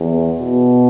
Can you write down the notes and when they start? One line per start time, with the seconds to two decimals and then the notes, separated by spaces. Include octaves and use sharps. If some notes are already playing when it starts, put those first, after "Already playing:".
Already playing: E2
0.39 B2